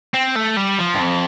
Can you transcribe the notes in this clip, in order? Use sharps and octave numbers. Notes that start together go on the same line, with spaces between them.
C4
A3
G3
F3
G2
F2